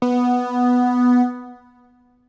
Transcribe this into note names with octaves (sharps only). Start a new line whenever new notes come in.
B3